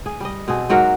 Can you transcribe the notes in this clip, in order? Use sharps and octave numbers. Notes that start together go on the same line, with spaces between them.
G#4
G3 D#5
B2 C4 G#4
G#2 F#3 F#4 A#4